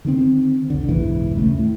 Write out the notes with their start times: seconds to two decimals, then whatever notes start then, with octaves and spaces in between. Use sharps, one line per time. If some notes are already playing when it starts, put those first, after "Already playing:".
0.05 D3 D#3 A#3 C4
0.70 F1 C2 D3
0.89 F#1 B1 G#2 E3
1.35 G1 D#2 C#3 A3
1.59 A2